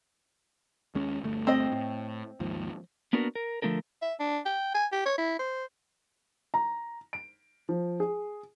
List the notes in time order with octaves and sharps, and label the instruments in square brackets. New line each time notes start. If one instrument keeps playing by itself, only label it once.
[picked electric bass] D#2 G#3 C#4
G1 D2 A3
[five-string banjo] C4 D#5
[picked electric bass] A2
D#2 G#2 F3
[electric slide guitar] A#3 B3 D4 F#4 A#4 B4
A#4
D3 F3 A3 D#4 A4 A#4
[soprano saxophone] E5
D4
G5
G#5
G4
C#5
E4
C5
[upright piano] A#5
D7
F3
G#4